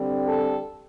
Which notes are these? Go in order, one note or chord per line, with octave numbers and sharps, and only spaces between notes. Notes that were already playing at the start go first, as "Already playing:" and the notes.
Already playing: D3 G3 C4
A4